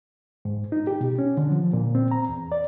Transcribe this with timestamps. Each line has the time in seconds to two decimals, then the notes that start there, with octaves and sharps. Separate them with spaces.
0.45 G#2
0.72 D#4
0.87 G4
1.01 B2
1.19 C#4
1.37 D3
1.51 F3
1.73 A#2
1.95 C4
2.11 A#5
2.29 E2
2.52 D5